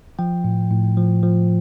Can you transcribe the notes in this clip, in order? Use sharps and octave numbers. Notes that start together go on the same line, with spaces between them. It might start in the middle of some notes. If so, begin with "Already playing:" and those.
F3 G5
A2
A2
F3
F3